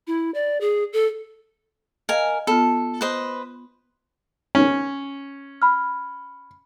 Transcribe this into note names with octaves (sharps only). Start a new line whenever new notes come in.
E4
D5
G#4
A4
A#4 D#5 F5 G#5
B3 F4 A4
B4 C5 D#5
C#4
B5 F6